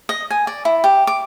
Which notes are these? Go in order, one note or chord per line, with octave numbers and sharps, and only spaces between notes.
D#5
G#5
D5
E4
G4
D6